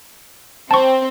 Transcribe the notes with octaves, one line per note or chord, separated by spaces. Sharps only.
C4 A5 C#6